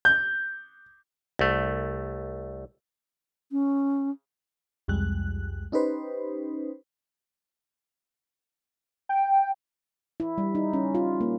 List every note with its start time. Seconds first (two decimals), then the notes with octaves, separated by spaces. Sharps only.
0.05 G6
1.39 C2 A3
3.52 C#4
4.88 C2 F2 G3 G#3 F#6
5.72 C#4 D#4 G4 B4 C5
9.09 G5
10.20 E4
10.38 G3
10.55 D#4
10.73 C#4
10.95 F4
11.21 A#3